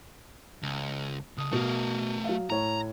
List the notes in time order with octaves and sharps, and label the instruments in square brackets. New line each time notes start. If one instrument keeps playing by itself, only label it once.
[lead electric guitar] C#2
[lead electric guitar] C#3 A5 [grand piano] D#6
[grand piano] B2 [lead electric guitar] A3 A#4
[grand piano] F#3 F5
[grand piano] A2 C#5 [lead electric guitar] A#5